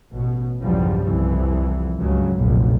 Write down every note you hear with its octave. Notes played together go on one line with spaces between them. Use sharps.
A1 B2
B1 E2 G2 C#3 F3 G3
C2 F2 E3
C#2 G2 C#3 F#3
F1 B1 A#2